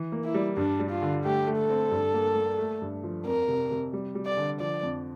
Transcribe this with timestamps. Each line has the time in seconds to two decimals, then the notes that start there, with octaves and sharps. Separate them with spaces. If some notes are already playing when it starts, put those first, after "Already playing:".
Already playing: E3
0.12 A#3
0.24 E4
0.34 G3
0.57 G2 D4
0.80 G3
0.91 F4
1.02 D3
1.24 A3 G4
1.47 A3
1.58 A4
1.69 C4
1.91 G2
2.14 A#3
2.36 A#3
2.59 A3
2.82 G2
3.04 F3
3.25 F2 A#4
3.48 C3
3.71 C3
3.93 G3
4.15 G3
4.26 D5
4.37 D3
4.60 F3 D5
4.83 F2